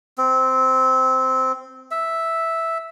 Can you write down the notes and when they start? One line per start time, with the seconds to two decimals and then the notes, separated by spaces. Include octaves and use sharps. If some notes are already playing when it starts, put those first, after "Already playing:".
0.18 C4
1.91 E5